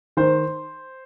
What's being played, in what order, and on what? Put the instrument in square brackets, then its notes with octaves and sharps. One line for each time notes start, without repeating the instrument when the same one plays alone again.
[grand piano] D#3 C5